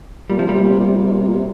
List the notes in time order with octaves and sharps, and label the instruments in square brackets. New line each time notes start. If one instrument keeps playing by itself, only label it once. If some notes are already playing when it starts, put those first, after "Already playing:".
[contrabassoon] A#2 [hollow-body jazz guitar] G3
[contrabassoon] C3 [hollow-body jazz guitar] F3
[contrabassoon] A#2 [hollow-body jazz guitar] G3
[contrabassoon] C3
A#2
C3
A#2
C3
A#2
C3
A#2
C3
A#2
C3